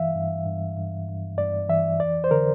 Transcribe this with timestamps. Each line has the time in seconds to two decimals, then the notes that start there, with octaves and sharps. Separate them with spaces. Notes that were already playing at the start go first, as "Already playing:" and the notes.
Already playing: G2 E3 E5 F5
0.15 G2
0.45 G2
0.77 G2
1.08 G2
1.38 G2 D5
1.69 E3 E5
2.00 F2 D5
2.24 C5
2.31 D3 A#4